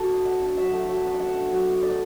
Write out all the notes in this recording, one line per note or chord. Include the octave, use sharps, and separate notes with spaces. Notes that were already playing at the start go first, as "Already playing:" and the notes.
Already playing: D4 F#4 A4
B3 E4
A3 F#5
D4
F#3 E5
A3 E4
F#3
B3 D4
F#5
A3 E5
D4
F#3
B3 E4
A3 D5